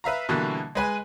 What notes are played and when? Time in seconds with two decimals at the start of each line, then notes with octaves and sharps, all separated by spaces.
0.04 B4 E5 F5 A#5
0.29 B2 D3 E3 G3 A#3
0.75 G#3 B4 G#5